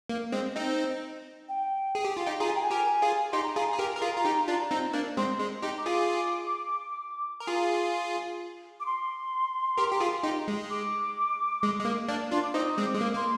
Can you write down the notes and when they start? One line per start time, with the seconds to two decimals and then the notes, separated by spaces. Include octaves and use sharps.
0.09 A#3
0.32 G#3 C4
0.56 C4 D#4
1.49 G5
1.95 G#4
2.05 G4
2.17 F4
2.27 D#4 G4
2.40 F4 G#4 A#5
2.48 G#5
2.55 G5
2.63 G#5
2.71 G4 A#4
3.02 F4 G#4
3.32 D#4 G4 C6
3.44 A#5
3.56 F4 G#4 G#5
3.68 A#5
3.74 G#4
3.79 G4 A#4
3.96 A#4
4.02 F4 G#4
4.17 F4
4.25 D#4 G4
4.48 D4 F4
4.71 C4 D#4
4.93 A#3 D4
5.17 G#3 C4 C6
5.40 G#3
5.62 D#4 G4
5.78 D6
5.86 F4 G#4
7.40 A#4
7.47 F4 G#4
8.80 D6
8.86 C6
9.78 G4 A#4
9.91 G4
10.00 F4 G#4
10.23 D#4 G4
10.48 G#3
10.70 D6
11.63 G#3
11.79 G#3
11.85 A#3
12.08 A#3 D4
12.31 D4 F4 C6
12.43 D6
12.54 C4 D#4 D#6
12.78 G#3 C4
12.85 D6
12.94 G#3
13.01 A#3
13.14 A#3 C6